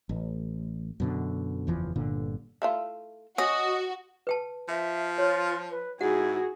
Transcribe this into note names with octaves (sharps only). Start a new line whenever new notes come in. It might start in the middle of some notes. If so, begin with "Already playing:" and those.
A1
F#2 B2 D3
F#1 E2 E3 F3
G1 A#2 D3
A3 E4 F4
C#4 F#4 D#5
B4 G5 A5
F3 E5
F4 C#5
B4
G#2 E4 F#4 G#4 F#5